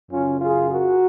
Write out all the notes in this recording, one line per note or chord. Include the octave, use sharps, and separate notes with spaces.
F#2 C#3 C#4 F4
F4 G#4
F#4 A#4